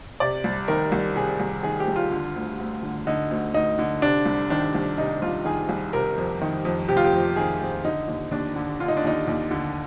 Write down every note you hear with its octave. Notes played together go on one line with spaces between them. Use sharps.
C3 D5
C2
D#3 A#4
C2
C3 G#4
C2
D#3 G#4
G4
C2
F4
D3
D2
D2
D3
D3 D#4
D2
D2 D#4
D3
C3 D4
C2
D#3 D4
C2
C3 D#4
C2 F4
D#3 G#4
C2
C3 A#4
F2
D#3
F2
C3 G4
F4
G4
F2
D#3 G#4
F2
D3 D#4
D#2
D#2 D4
D3
D3 F4
D#4
D4
D#2 D#4
D#2
D3